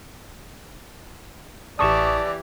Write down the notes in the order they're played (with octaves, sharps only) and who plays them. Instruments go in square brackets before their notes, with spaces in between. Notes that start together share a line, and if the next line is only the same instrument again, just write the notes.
[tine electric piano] A1 C#6 D#6 [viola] E3 G4 [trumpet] D5 [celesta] A5 E7